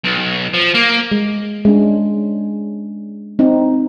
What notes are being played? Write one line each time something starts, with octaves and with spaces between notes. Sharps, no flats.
B1
F3
A#3
G#3
G#3 C#4 D4
C4 D#4